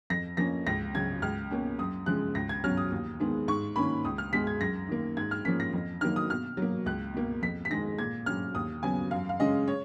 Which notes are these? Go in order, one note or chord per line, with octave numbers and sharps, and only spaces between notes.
F2 A#6
F3 A#3 C#4 A#6
C#2 A#6
C#3 F#3 C#4 G#6
C#2 F6
B2 A#3 C#4
F#2 D#6
C#3 F3 G#3 F#6
C#2 A#6
G#6
B2 F#3 C#4 F6
D#6
D#2
D#3 G#3 B3
G#2 C#6
D#3 A#3 C#4 B5
C#2 D#6
F6
B2 G#3 B6
G#6
F#2 A#6
D#3 A#3
G#2 G#6
F6
F3 A#3 C#4 B6
A#6
F2
D#3 F#3 A#3 F6
D#6
B2 F6
F#3 A#3
C#2 F#6
B2 A#3
F2 B6
B6
D#3 G#3 A#6
A#2 G#6
F#3 C#4 F6
D#2 D#6
C#3 F#3 B3 G#5
F#2 F5
F5
C#3 G#3 C#4 D#5
C#5